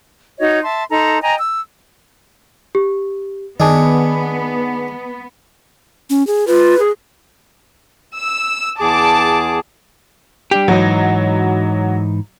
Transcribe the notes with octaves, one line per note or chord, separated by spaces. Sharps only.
D#4 F#4 C#5 D#5
E5 A5 C6
D#4 A4 A#5 C6
D#5 G5 G#5 A#5
E6
G4
D#3 B3 D4 G#4 D#5 A5
C#4
G#4
F4 B4
G#4
E6
E2 G#4 A5 D6
G3 D4 G4
G#2 E3 F#3 D#4